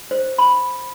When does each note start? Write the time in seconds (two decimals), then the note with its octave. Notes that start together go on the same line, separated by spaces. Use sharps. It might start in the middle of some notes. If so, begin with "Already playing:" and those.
0.11 C5
0.38 B5